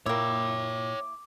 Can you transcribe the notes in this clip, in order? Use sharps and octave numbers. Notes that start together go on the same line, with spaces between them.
A#2 A#3 E4 C#5 G5 D6